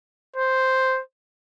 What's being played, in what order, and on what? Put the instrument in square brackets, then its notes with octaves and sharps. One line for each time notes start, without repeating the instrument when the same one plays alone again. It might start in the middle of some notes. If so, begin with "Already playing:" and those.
[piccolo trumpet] C5